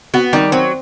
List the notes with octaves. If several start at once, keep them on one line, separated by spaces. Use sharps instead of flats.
B3 F#4
D#3 G3
F#3 C4